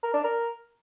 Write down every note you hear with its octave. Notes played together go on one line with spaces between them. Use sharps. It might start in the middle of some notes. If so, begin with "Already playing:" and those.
A#4
D4
A#4